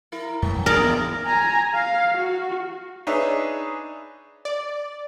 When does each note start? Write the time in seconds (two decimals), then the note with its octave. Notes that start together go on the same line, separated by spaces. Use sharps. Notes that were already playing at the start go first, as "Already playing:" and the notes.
0.12 E4 A#4
0.42 F#2 A3 A#3
0.54 A#1 F#2
0.66 D4 G#4 A#4 D5
0.79 G2 A#2 E3 B3
1.25 G#5 A#5
1.74 F5
2.17 F#4
3.07 D4 D#4 G#4 B4 C#5 E5
4.45 D5